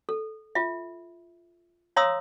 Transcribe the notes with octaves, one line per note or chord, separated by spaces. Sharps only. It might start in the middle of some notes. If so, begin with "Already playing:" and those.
A4
F4 E5
C#5 F5 A#5 C6 D#6 E6